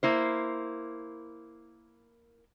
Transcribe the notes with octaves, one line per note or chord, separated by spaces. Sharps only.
A#3 E4 C5